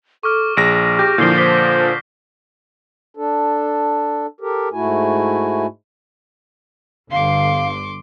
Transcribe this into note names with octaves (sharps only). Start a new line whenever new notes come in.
A4 C#6 D6 F6
A#1 G#4 A#6 D7
G4 G6 A#6
A#2 D3 F3 E4 G6 C7 G7
C5 D6 B6 G7
D4 A4
G4 A4 A#4
G#2 A3 E4 F#4 G#5
G1 D3 F5 C6 D6